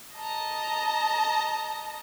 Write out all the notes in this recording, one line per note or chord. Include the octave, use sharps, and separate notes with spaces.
D#5 A5 A#5